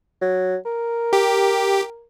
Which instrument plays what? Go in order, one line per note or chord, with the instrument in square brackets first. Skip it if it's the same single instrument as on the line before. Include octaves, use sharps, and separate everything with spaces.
[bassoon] F#3
A#4
[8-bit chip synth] G4